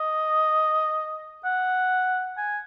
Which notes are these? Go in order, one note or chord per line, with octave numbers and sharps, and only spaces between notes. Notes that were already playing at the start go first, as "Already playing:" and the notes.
Already playing: D#5
F#5
G#5